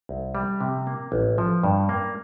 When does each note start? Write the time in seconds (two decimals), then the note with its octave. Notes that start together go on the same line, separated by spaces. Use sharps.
0.09 C2
0.35 G3
0.61 C3
0.87 A#3
1.12 A1
1.38 F3
1.63 G2
1.89 A#3